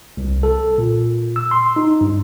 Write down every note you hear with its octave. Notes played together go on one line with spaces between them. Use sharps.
C2
A4
A#2
E6
C6
D#4
G2